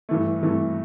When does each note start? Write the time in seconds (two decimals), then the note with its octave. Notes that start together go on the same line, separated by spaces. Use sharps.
0.09 G2 E3 A3
0.42 G2 E3 A3